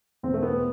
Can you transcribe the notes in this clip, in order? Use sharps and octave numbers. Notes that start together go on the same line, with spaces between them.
E2 B2 C4
A3
B3